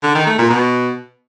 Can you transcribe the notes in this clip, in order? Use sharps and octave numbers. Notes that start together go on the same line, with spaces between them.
D3
D#3
A3
A#2
B2